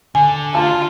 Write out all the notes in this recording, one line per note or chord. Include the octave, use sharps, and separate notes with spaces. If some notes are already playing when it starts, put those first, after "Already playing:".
D3 G#5
F4 A5